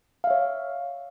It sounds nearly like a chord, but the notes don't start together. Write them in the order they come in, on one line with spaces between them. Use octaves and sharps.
F5 E5 C#5